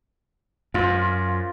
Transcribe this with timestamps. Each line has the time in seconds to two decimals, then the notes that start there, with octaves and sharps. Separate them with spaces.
0.74 F#2 F4 C5